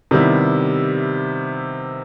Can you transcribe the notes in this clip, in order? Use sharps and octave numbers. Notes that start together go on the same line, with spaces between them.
C3 D#3 G3 B3 E4